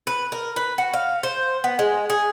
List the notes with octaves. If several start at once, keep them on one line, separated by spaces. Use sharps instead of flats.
B4
A#4
B4
F#4
F5
C5
B3
G#3
G#4